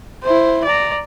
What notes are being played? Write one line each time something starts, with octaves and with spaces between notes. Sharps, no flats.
E4 C5
D5 A#5